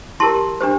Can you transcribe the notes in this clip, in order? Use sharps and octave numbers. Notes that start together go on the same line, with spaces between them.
E4 G4 A#4 A5 C6
D4 G4 C5